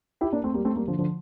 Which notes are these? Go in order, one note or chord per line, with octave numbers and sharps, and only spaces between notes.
E4 G4
A#3 D4
A3 C4
G3 A#3
A3 C4
G3 A#3
D3 F3
D3 F3